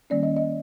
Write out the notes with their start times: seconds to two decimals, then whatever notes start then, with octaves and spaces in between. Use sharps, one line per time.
0.10 D#3 G3 A#3 C#4 D5
0.23 D#5
0.37 D#5